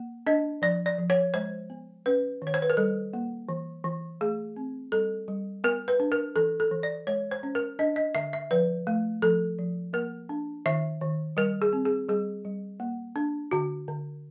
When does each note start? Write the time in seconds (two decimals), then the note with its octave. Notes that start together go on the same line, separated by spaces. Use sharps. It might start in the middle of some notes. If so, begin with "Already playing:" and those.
Already playing: A#3
0.27 D4 D#5
0.62 F3 D5
0.86 D5
0.99 F3
1.10 C#5
1.34 G#3 C5
1.70 B3
2.06 C#4 B4
2.42 D#3
2.47 C#5
2.54 C5
2.62 B4
2.70 A#4
2.77 G3 A4
3.13 A#3
3.49 E3
3.84 E3
4.21 A3 G#4
4.57 C4
4.92 G3 A4
5.28 G3
5.64 B3 A#4
5.88 B4
6.00 D4
6.12 A#4
6.36 E3 A4
6.60 A4
6.71 E3
6.83 D5
7.07 G#3 C#5
7.31 C5
7.43 C#4
7.55 A#4
7.79 D4 D#5
7.96 D#5
8.15 D3 E5
8.33 E5
8.51 F3 B4
8.87 A3
9.22 F3 A4
9.58 F3
9.93 A#3 A#4
10.29 D4
10.66 D#3 E5
11.01 D#3
11.37 G3 A#4
11.62 G#4
11.73 C4
11.85 G#4
12.09 G3 G#4
12.45 G3
12.80 A#3
13.16 D4
13.51 D3 F#4
13.88 D3